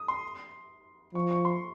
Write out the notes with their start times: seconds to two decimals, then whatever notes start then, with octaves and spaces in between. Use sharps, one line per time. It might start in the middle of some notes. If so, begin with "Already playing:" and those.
Already playing: D#6
0.08 C6
1.15 F3 C#6
1.31 C#6
1.45 C6